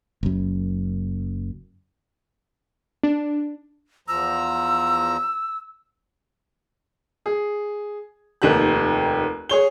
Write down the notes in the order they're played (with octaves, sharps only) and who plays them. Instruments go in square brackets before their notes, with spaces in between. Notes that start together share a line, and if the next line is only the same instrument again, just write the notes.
[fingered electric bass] F#1 F#2
[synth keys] D4
[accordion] E2 F3 A#5 [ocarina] E6
[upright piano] G#4
F1 D#2 G4 F#6
G#4 C#5 G7